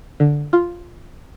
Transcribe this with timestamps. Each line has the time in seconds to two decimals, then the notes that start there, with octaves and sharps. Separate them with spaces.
0.20 D3
0.53 F4